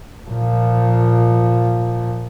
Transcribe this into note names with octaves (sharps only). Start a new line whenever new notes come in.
A#2 F3